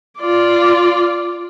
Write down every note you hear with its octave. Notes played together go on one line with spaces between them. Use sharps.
F4 D5